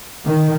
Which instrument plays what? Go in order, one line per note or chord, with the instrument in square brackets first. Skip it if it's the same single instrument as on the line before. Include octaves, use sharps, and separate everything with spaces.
[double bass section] D#3